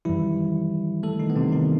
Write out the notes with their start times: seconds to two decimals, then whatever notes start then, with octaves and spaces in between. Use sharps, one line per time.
0.05 F#2 D#3 E3 G3 E4
1.03 A3 A4
1.20 D#3 D#4
1.30 B3
1.36 C3 C4
1.52 D#3 D#4